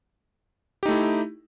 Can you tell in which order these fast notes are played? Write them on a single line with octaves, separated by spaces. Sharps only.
G4 D#4 A3 E4